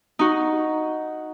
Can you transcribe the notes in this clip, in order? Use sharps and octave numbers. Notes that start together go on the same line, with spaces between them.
D#4 F#4